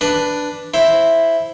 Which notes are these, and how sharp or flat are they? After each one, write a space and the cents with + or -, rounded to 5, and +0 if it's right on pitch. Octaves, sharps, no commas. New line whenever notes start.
D4 +0 B4 +0
E4 +0 C5 +0